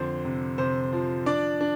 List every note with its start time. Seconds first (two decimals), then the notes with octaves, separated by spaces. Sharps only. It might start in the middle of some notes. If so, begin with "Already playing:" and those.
Already playing: F2 D3 C5
0.25 C3
0.58 C3 C5
0.92 F3
1.26 D4 D5
1.61 D4